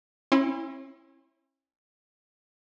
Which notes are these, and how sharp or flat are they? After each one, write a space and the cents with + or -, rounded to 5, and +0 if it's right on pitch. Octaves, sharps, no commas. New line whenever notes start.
C#4 -40 E4 +0 C6 +0